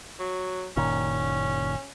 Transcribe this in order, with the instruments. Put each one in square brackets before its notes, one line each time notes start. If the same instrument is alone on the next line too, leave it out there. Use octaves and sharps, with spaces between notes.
[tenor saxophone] F#3
[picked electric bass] F#1 A#2 D#3 [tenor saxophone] C#4